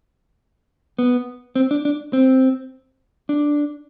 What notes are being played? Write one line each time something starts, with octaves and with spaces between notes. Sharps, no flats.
B3
C4
D4
D4
C4
D4